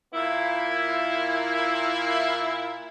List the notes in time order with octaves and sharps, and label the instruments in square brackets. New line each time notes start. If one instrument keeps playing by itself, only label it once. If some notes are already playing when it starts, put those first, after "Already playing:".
[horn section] A#2 A#3 E4